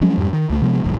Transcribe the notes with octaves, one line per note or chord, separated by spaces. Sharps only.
F3 F#3 G#3 C#4
F2 G#2 G3
D#3
C#2 A3
C3 F3 G#3 B3
D1 A#1 G2